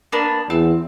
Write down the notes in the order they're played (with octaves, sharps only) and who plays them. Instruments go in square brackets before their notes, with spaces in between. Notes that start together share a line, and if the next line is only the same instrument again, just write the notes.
[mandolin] A#3 B3 D4
[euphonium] E2 [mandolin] C4